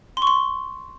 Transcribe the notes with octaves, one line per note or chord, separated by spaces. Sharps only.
C6
C#6
C6